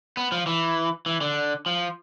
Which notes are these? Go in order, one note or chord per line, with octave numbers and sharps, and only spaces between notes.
B3
F3
E3
E3
D3
F3